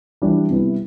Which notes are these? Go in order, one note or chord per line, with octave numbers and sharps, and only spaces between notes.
E3 G3 D4
C3 G3 B3 E4